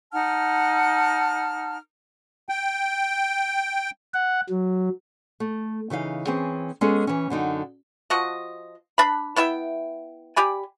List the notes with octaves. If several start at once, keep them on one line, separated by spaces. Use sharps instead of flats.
D#4 F#5 A5 F6
G5
F#5
F#3
A3
C#3 E3 D#4 F5
E3 C4 C#4 G#4
G#3 B3 C#4 G#4 A4
E3 C#4
F#2 D3 D#4 G5
F3 F#4 D#5
D4 B5
B3 E4 E5 G5
G4 D5 G#5 B5